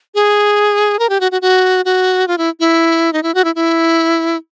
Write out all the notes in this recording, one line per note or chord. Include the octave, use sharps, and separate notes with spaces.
G#4
A#4
G4
F#4
F#4
F#4
F#4
F4
E4
E4
D#4
E4
F#4
E4
E4